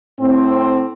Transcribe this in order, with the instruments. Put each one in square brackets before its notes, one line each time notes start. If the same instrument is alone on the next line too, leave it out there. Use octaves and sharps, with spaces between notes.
[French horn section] A2 C4